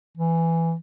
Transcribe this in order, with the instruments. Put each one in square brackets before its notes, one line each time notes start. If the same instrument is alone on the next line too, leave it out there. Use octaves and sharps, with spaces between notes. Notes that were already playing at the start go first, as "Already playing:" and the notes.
[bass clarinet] E3